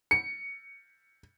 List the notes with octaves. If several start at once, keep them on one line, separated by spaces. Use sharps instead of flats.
C#7